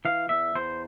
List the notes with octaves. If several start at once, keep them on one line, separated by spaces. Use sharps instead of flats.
E3 F5
E2 E5
E2 C5